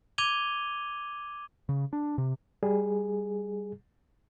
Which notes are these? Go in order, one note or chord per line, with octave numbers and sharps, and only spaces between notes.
D6 G#6 D#7 F7 G7
C#3
D4
C3
G3 G#4